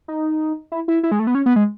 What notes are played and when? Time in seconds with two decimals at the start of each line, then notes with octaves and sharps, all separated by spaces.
0.08 D#4
0.72 E4
0.88 E4
1.03 E4
1.12 G#3
1.19 A3
1.27 B3
1.35 C#4
1.46 B3
1.56 G#3